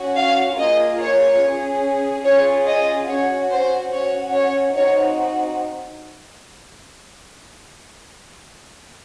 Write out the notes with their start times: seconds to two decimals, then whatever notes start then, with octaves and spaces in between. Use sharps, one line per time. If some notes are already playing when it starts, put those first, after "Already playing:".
Already playing: C#4 F#4
0.16 F5
0.57 A#3 F4 G#4 D#5
1.00 C#5
1.41 C#4
1.46 G#4
2.25 C#4 F4 G#4 C#5
2.67 D#5
3.08 C#4 F#4 C#5
3.51 C5
3.92 C#4 F#4 C#5
4.34 C#5
4.76 C4 D#4 F#4 C#5